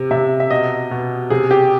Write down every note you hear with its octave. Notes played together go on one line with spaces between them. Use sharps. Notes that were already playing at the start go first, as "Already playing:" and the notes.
Already playing: C3
C3 E5
E5
B2 D#5
B2
C3 G#4
G4